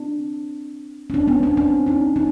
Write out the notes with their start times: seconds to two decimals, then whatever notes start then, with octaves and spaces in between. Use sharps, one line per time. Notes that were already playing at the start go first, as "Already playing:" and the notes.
Already playing: C4 D4
1.10 C#4
1.14 C4 D4
1.28 B3 C#4
1.43 C4 D4
1.57 C4 D4
1.86 C#4 D#4
2.16 C#4 D#4